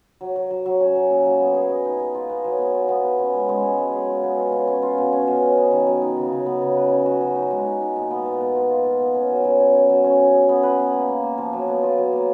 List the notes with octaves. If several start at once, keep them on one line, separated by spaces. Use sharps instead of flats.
F#3
F#3
F#3
F#3
C#4
F#3
A#2
F#3
B3
G#4
D#5
D#4
G#4
F4
B3
F#3
B3
F4
B3
B3
C#4
G#3
G#3
G#3
F#3
G#4
F4
B3
F4
C#4
C#4
F4
B2
C#4
B2
C#4
B3
D#3
F#3
D#4
C#3
C#3
B3
C#3
B4
C#4
F#4
F#3
D#4
G#3
D#4
D#4
A#2
B3
A#2
B3
F4
F4
F4
B3
C#4
F#3
F#3
C#4
C#4
F#3
C#4
C#4
G#4
B3
B4
B3
A#3
A#3
A#3
F3
F#3
B3
F4
F#3
A#3